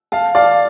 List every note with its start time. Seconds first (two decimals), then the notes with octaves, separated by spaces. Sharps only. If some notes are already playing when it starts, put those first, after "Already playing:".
0.12 F5 A5
0.35 D5 F5